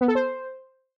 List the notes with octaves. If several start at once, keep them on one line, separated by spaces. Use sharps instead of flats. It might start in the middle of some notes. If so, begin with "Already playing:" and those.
B3
A4
C5